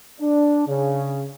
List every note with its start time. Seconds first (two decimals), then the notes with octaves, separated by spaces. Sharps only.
0.20 D4
0.66 C#3